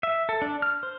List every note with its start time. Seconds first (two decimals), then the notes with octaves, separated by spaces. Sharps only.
0.03 E5
0.29 A4
0.42 D4
0.62 F6
0.83 C5